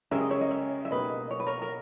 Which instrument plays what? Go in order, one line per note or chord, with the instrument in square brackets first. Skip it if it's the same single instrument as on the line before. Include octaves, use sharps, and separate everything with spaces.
[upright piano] C#3 G#3 C#4 G4 A#4 [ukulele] E5
[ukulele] D#5
C#5 E5
D#5
C#5 E5
E5
[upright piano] B2 A#3 D#4 G4 [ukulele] B4 D#5
[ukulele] C#5
B4
A#4 C#5
A#4